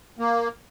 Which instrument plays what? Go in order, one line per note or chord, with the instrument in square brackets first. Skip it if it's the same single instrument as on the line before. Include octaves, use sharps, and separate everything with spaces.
[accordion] A#3